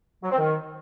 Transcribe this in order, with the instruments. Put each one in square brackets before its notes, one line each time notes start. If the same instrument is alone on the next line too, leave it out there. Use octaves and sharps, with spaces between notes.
[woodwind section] F#3
C4
D#3